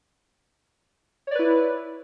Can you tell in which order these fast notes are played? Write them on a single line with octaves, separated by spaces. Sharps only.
C#5 D5 B4 E4